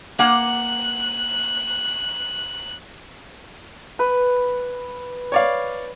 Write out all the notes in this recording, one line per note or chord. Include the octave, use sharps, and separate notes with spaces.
A#3 F#5 F#6
B4
C#5 D5 F5